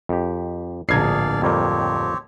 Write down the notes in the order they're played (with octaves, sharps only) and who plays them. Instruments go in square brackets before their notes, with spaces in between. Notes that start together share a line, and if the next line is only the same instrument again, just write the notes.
[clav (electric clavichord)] F2 G4
[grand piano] D1 G#6 C7 [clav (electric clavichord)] A#1 A#5 [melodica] G#4 D5 F5
[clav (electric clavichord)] F2 G3 A#3 [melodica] C4 G4 C#5